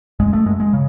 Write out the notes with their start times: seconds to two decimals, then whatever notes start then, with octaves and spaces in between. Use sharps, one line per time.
0.20 F#2 G#3
0.33 A3
0.46 F#2 G#3
0.60 G#3
0.73 C#3